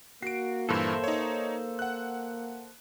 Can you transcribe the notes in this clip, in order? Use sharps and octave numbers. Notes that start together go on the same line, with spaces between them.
A#3 F#4 C7 D7
G2 A#2 E3 A4 C5 E5
D#4 C#5
F#5 F#6